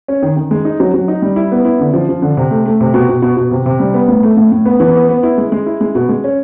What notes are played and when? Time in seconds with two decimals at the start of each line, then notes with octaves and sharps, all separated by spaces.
0.08 C#4
0.22 D#3
0.36 D#3
0.51 G#3
0.65 D#4
0.80 F#3
0.94 F#3
1.08 D#4
1.22 G3
1.36 E4
1.52 B3
1.65 E4
1.80 D3
1.94 F3
2.09 F3
2.22 D3
2.37 C3
2.51 A3
2.65 A3
2.81 C3
2.94 B2
3.09 B2
3.22 B2
3.37 B2
3.51 C3
3.66 C3
3.80 G3
3.94 B3
4.08 A2
4.23 A3
4.37 A2
4.51 A2
4.65 B3
4.80 E3
4.95 B3
5.09 B3
5.23 E4
5.38 G#3
5.52 G#3
5.66 E4
5.81 G#3
5.95 B2
6.09 G#3
6.24 C#4